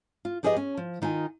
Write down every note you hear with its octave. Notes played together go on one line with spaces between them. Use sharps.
F4
F3 G4 G#4 B4 C5 D#5
C#4
F3
D#3 D#4 F4 G#5